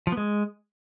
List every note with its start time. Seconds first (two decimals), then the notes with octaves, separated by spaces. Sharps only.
0.07 F3
0.12 B3
0.17 G#3